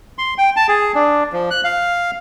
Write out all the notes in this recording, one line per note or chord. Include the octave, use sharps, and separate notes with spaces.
C6
G5
A5
G#4
D4
F3
F#6
F5